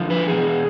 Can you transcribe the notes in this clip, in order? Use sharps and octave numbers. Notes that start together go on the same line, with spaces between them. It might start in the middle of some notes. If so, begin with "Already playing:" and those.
Already playing: D3 F3
B4
E2 B2 G#4